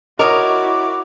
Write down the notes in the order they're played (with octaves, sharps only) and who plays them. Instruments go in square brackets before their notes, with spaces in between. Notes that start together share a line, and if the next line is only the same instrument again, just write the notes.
[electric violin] E4 F#4 [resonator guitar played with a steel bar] A#4 C#5 [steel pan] D#5 [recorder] D6